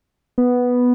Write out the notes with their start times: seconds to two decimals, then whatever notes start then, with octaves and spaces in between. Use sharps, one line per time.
0.38 B3